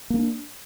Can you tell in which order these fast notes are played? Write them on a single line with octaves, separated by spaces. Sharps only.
A#3 C#4 D4